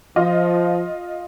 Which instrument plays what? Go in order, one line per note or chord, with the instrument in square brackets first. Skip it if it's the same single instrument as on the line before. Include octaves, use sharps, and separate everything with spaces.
[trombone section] F3 [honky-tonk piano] F4 D#5